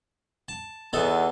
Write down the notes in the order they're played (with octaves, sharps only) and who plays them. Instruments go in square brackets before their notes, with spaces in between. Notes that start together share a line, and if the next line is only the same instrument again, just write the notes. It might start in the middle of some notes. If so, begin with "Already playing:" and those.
[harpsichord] A5
[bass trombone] E2 [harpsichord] B3 D#4 A4